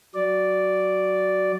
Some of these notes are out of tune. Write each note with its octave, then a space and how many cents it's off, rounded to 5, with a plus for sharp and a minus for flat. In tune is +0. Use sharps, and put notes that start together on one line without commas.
F#3 +10 D5 -5